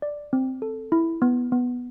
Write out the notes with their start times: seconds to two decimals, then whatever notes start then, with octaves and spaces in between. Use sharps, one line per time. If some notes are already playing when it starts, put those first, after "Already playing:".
0.02 D5
0.33 C4
0.62 A4
0.92 E4
1.22 B3
1.52 B3